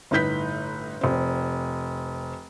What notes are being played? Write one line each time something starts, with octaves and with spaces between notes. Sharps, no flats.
G1 A2 D#4 B4 G6 B6
F1 C4